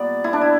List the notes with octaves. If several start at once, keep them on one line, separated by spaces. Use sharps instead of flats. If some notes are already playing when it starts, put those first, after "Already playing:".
Already playing: A#2 G3 B3 D5
E4
D4
E4